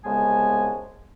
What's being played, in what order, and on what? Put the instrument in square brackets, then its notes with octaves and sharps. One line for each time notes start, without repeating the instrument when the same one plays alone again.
[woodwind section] C2 C#3 G#3 B3 G#5 A5